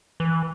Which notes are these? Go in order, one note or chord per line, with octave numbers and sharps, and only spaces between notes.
E3